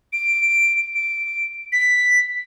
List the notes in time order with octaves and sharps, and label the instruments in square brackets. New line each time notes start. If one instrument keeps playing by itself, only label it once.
[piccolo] D7
D7
B6